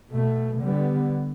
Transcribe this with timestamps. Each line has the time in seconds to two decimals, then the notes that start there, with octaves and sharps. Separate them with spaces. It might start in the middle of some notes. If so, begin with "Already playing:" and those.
0.11 B2 A3
0.61 D3 G3 B3